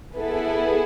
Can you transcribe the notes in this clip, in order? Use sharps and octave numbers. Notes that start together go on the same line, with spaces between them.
B3 E4 G#4 A4 B4